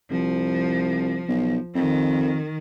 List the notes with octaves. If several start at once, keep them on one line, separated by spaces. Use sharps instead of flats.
C2 F3
B1
F2 D#3